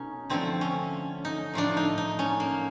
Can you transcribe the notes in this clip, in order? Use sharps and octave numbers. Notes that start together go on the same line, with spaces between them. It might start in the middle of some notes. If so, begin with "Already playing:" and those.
Already playing: B2 A3 C#4 D#4
D3 F3 A3 C4
C#4
D#4
A2 F3 A3 D4
D#4
D#4
C#4
A#3